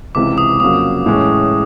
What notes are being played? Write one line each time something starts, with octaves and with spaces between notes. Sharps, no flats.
C#2 C3 E3 D6
D#6
F2 C#3 F#3 A#3 D#6
A2 E3 G#3 C#4